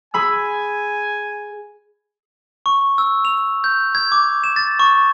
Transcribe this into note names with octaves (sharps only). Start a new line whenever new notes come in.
G#4 G#5 B5 E6
C#6
E6
F7
G6
G#6
D6
E7
A6
C#6